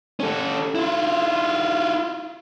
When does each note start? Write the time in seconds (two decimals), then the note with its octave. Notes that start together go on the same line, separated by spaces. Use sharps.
0.20 C#4 A4
0.75 E4 F4